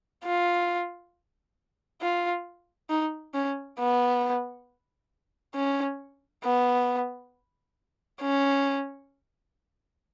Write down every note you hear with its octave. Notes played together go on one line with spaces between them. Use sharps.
F4
F4
D#4
C#4
B3
C#4
B3
C#4